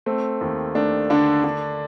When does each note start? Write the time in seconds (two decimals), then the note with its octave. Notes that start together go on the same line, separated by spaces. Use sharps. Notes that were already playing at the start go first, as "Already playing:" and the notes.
0.06 A3 C4
0.41 D#2
0.75 A3 D4
1.10 D3 D4
1.44 D3